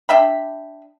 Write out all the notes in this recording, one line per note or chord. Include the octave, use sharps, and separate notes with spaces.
D4 E5 G5 B5